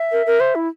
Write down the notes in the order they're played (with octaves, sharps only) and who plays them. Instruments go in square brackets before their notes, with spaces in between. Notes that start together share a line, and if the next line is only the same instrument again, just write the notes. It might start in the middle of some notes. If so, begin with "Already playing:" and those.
Already playing: [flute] E5
[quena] A#4
A#4
C5
E4